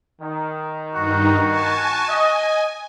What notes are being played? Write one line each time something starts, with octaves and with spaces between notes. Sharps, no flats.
D#3
G2 D#4 F#4
G#5 A5
D#5 G#5